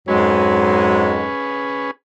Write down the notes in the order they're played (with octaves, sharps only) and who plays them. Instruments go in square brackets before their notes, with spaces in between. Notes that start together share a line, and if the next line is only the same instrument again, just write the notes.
[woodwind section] F2 G#2 G#3 [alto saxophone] F#3 [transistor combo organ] C#4 G#4 B4